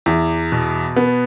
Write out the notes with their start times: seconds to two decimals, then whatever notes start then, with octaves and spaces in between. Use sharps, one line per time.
0.06 E2
0.52 B2
0.96 B3